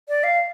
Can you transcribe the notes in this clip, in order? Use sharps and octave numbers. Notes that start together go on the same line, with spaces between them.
D5
F5